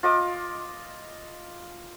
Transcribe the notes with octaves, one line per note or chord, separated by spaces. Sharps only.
F4 D#5 D6